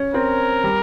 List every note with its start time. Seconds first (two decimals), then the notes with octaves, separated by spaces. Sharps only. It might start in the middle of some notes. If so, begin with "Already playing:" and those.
Already playing: C#4
0.14 C4 A#4
0.64 G3